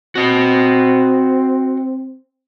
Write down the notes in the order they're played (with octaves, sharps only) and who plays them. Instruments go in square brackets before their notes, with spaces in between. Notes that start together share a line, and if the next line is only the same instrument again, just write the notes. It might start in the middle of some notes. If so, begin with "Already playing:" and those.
[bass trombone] C4 [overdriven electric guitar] F#4 D#5